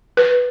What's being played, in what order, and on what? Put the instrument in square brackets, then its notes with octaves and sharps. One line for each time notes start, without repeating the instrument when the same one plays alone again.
[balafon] B4